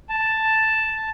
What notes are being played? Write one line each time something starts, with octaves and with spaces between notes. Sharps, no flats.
A5